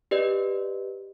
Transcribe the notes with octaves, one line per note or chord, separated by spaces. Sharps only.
G4 B4 D5 D#5